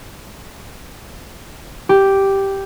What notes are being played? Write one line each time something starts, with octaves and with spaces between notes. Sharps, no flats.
G4